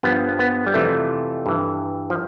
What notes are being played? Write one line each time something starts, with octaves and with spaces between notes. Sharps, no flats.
G2 F3 B3
B3
G3
F2 C3 E3 A3
G2 E3
F3